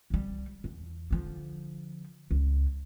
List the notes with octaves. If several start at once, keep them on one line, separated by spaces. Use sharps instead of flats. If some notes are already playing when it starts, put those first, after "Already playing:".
C2 G3
E2
D3 F3
C#2